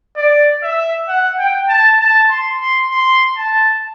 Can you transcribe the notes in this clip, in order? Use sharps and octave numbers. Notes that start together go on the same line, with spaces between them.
D5
E5
F#5
G5
A5
A5
C6
C6
C6
A5